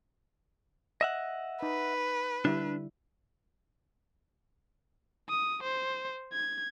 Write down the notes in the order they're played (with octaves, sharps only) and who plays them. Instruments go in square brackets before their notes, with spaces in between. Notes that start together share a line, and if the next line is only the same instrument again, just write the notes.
[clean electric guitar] D#5 E5 F#5
[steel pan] D#4 [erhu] B4
[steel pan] D3 G3 E4 [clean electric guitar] D4
[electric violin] D#6
C5
G#6